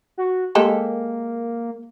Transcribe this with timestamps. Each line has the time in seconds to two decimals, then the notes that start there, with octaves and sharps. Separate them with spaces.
0.18 F#4
0.55 G#3 A#3 G4 A4